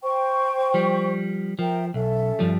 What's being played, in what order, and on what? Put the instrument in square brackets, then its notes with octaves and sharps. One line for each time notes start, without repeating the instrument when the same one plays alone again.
[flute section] C5 G5 C#6
[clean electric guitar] F3 G3
[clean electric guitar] F3 [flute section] A#4 E5 G5
[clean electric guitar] B1 [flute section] C#4 A4 E5
[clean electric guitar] G2 F3 G3